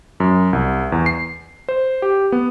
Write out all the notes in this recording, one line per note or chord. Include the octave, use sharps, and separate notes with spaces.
F#2
C2
E2
C7
C5
G4
B3